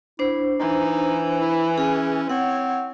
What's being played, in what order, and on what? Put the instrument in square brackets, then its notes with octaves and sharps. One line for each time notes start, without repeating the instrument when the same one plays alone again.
[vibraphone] D4 C5 [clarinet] E4
[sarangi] E3 [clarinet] D#4
[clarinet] E4
[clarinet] C#4 [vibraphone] G#4
[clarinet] C4 [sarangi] C#5 [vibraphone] F#5